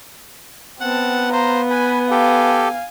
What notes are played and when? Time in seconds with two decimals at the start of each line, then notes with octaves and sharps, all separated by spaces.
0.80 B3 C4 F#5 A5
1.32 C5 F5 A#5
1.70 B4 G#5
2.11 G4 A4 F5 G#5